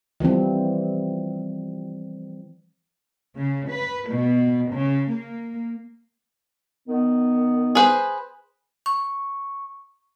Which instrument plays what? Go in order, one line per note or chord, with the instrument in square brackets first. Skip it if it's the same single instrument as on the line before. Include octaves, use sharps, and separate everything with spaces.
[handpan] E3 F3 G3 C4
[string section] C#3
B4
B2
C#3
A#3
[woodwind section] D#3 B3
[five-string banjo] G#4 B4 C5
[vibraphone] C#6